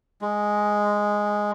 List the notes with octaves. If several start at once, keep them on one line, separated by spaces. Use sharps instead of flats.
G#3